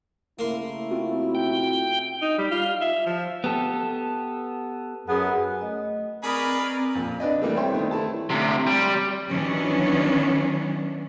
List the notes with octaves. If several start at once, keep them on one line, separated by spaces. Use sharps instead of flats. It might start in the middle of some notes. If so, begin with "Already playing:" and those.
C#3 A3 A#3 E4 A#4 C6
C4 F4 F#4
G5
D#4
G3
F4
E5
F3
B3 G4 A4
F#2 B3 G#4
A3 D#5
C4 G#4 A#4 B4 D5 B5 C#6 D#6
F2 A#2
D4 B4 D5 D#5
E3 G3 A3 A#3 C4
C5 C#5 E5 G5 C6
D#3 A3 B3
A3 E4 A5
D2 C3
G3
D#3 E3 F#3 B3 C#4 D4